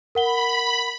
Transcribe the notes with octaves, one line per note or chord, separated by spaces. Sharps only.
A#4 F#5 B5 G7